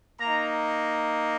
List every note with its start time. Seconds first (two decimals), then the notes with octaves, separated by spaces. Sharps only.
0.20 A#3 D#4 A#5